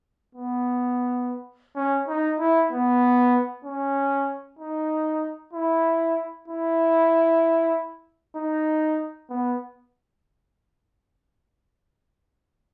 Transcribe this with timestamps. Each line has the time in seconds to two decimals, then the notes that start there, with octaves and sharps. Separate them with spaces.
0.35 B3
1.76 C#4
2.08 D#4
2.39 E4
2.71 B3
3.65 C#4
4.59 D#4
5.53 E4
6.48 E4
8.36 D#4
9.30 B3